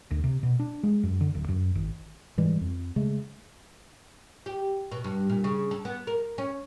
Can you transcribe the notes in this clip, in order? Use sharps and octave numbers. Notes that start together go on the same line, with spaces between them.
D2
C3
B2
D4
G#3
F#2
D3
D1
F#2
G#1
G#2 E3 G3 G#3
F2
C#3 G#3 A3
G4
B2
G2
A#2
C#3
A4
B3
A#4
C#4